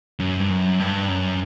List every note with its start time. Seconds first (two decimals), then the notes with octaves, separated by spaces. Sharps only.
0.20 F#2
0.40 G2
0.50 F#2
0.80 G2
1.09 F#2